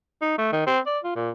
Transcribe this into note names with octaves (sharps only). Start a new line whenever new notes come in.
D#4
A3
D#3
C4
D5
F4
A#2